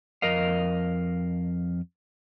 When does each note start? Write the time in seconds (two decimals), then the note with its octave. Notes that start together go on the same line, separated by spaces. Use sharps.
0.22 F2 A#4 D#5 F5